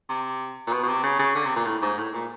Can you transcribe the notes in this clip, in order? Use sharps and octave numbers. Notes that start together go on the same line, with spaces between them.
C3
A#2
B2
B2
C3
C#3
C#3
D3
C3
A#2
A2
G#2
A2
A#2